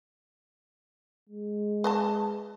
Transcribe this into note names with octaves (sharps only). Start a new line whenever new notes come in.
G#3
B4 D#5 A5